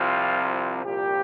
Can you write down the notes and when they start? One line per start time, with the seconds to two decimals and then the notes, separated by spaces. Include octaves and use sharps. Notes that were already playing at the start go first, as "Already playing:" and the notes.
Already playing: C2 C3 F3 F4
0.85 C2 A#2 F3 C4 G4